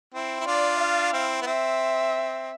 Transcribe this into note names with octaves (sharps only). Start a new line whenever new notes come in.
C4 E4
E4
D4 F4 D5
F5
C4 E4
B3
C4 E5